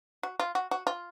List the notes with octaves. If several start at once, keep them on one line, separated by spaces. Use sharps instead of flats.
F#4
F4
F#4
F#4
F4